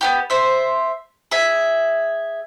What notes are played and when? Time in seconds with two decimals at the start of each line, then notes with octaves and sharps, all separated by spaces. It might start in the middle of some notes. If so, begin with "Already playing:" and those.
0.01 B3 D4 G4
0.30 C5 E5
1.31 G#4 E5